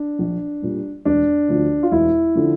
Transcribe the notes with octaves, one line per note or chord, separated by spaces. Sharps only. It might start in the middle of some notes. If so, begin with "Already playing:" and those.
Already playing: D4
A#1
A#2 G3
E1 D4
D2 D3 F3
F4
E1 E4
D3 F3